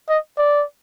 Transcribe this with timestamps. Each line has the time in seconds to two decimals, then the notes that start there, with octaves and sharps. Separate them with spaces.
0.10 D#5
0.38 D5